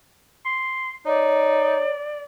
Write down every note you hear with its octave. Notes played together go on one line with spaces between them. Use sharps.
C6
D#4 C#5 D5